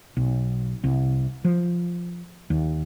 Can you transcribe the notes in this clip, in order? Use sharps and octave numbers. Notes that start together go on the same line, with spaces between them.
B1
C2
F3
D#2